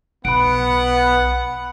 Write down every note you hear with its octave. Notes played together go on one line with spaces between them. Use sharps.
B1 B3 F#5 B5 D7